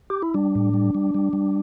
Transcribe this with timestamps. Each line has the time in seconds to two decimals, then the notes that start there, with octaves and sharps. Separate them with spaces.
0.10 G4
0.22 E4
0.34 G3 D4
0.55 A2
0.74 G3
0.95 G3
1.15 G3
1.33 G3